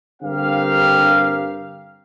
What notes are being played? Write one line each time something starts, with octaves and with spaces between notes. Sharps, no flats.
G2 D3 C4 G4 A#4 F5